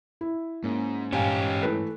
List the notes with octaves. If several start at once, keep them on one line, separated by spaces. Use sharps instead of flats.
E4
G#2 A#3 C#4
G2 C#4 G4 F5 G#5
E3 A3 B4